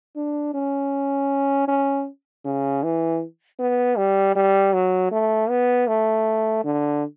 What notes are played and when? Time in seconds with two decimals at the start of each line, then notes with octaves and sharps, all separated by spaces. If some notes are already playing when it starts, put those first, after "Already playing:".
0.16 D4
0.54 C#4
1.68 C#4
2.45 C#3
2.83 E3
3.59 B3
3.97 G3
4.36 G3
4.74 F#3
5.12 A3
5.50 B3
5.88 A3
6.64 D3